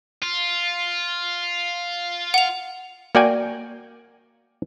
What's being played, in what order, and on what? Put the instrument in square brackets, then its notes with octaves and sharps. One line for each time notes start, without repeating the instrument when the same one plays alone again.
[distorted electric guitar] F4
[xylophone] F#5 F7
[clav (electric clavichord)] A#3 F#4 D5 G5 G#5